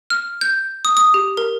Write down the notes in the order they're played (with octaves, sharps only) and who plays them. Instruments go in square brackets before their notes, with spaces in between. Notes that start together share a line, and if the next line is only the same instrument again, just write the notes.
[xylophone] F6
G6
D#6
D#6
G4
A#4